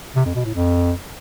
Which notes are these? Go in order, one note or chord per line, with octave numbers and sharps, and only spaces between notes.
C3
F2
B2
A2
F2